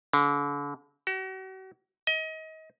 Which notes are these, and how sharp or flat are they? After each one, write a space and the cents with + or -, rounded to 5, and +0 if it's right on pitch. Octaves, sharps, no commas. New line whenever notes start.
D3 -40
F#4 +40
D#5 +30